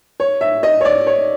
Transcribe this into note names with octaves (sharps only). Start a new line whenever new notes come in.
C#5
E5
D#5
C#5
D5
C#5